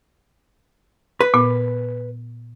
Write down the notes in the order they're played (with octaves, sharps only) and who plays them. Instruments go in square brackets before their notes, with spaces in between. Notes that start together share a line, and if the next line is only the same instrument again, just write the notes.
[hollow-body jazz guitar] B4
[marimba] A#2 B3